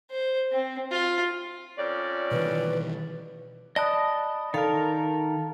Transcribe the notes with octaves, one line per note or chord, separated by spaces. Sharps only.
C5
C4
F4
F2 C#4 D5
B2 D#3 E3 B4
D5 D#5 A5 B5 D#6 F#6
D#3 A4 A#4 F5 A5